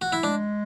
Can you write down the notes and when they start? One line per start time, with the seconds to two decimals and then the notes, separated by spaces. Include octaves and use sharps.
0.01 F#4
0.12 E4
0.23 G#3 D4